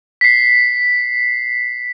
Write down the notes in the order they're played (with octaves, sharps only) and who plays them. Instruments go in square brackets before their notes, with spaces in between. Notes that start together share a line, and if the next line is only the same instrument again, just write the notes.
[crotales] B6 C7